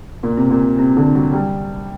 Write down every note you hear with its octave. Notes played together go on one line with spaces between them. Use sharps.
A#2
C3
A#2
C3
D3
F#3
G3